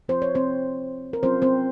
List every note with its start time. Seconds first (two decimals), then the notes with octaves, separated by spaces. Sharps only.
0.09 F3 C4 F4 C5
0.22 C#5
0.35 C4 C5
1.13 A#4
1.23 F#3 C4 C#4 F4 C5
1.42 C4 C5